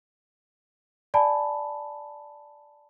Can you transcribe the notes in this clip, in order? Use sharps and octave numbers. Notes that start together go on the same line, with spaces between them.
D5 G#5 A5 B5